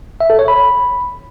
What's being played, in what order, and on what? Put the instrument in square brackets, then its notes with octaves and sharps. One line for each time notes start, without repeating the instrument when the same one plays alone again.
[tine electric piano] E5
A4
C#5
B5